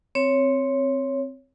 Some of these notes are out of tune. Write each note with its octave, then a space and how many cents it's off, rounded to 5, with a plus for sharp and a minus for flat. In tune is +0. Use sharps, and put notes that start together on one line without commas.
C4 +0 C#5 +0